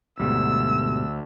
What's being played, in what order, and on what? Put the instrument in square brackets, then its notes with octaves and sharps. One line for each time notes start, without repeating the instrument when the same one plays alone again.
[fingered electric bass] D2 [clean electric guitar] G#2 B2 G3 [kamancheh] E6